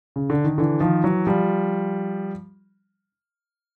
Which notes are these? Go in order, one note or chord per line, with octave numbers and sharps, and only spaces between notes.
C#3
D3
D#3
D3 E3
D#3 F3
E3 F#3
F3 G3